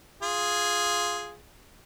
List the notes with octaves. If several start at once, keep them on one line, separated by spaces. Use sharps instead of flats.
F4 G#4